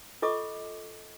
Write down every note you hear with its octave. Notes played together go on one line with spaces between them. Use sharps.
F4 A4 D#5 C#6 D6